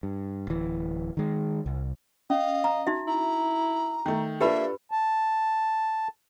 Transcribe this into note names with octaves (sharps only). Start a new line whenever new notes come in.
G2
D1 E3
D#3 G#3
C2
C#4 D#5 F5
A#5
D#4 F#4 E5
E4 A#5
D#3 A3
A#3 D4 F4 G4 A4 B4 E5 B5
A5